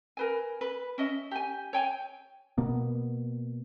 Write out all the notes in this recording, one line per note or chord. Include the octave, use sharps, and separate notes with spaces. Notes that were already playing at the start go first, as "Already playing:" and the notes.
A#4 B4 G#5
B4
C#4 D#5 E5
G4 G#5
C#5 G5 G#5
B2 A#3 B3